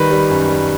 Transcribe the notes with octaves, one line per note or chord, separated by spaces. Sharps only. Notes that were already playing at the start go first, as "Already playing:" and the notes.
Already playing: D#3 G3 B4
G3
F#2
G3